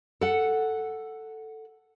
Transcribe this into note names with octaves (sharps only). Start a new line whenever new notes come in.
A4 F#5